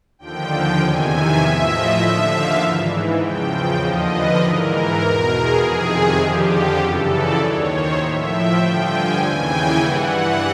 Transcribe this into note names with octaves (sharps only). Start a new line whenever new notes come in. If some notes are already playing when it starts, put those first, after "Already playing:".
D#2 D3 F3 G5
G5
E2 C3 D#3 G#5
E5
A2 F3
D#5
D#2 D3 F3 E5
F5
G#2 E3
E2 C#3 F3 G5
G5
D#2 D3 F3 D#5
B4
G#2 E3 A#4
E2 B2
G#4
F2 C3 D#3
F2 D3 F3 G4
F#2 C#3 E3 A4
D5
D#2 D#3 C#5
C5
A2 F3 E5
G5
G2 D3 F3
G#5
D#2 C#3 E3 G#5
G5
G2 E3 F#5
F#5